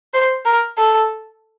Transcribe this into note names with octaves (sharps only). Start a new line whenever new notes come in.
C5
A#4
A4